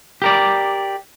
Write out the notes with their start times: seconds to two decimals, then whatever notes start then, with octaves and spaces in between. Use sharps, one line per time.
0.22 G4 A#4 D5